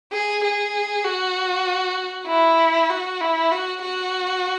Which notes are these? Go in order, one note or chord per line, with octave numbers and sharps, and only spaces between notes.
G#4
G#4
F#4
E4
F#4
E4
F#4
F#4